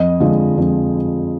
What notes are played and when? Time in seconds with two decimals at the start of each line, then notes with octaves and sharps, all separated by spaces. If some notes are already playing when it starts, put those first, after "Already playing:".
Already playing: F2 D#5
0.20 D3 F3 G#3
0.58 F2